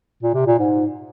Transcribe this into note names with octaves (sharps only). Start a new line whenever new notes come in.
A#2
C3
A#2
G#2